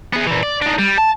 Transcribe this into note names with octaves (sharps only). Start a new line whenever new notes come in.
B3 G#4
A#2 E3
D5
D4 D#4
G3
A5